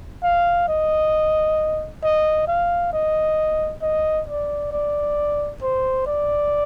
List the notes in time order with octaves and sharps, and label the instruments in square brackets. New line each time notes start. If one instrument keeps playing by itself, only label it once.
[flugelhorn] F5
D#5
D#5
F5
D#5
D#5
D5
D5
C5
D5